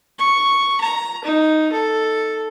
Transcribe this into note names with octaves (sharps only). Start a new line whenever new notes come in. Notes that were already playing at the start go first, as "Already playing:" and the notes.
C#6
A#5
D#4
A4